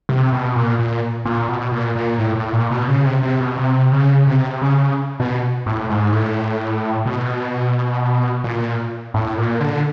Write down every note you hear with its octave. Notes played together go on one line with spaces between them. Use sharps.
C3
B2
A#2
A#2
A#2
B2
A#2
A#2
A2
A2
A#2
B2
C#3
C3
C3
B2
C3
C#3
C3
C#3
B2
A2
G#2
A2
B2
A#2
A2
A#2
D3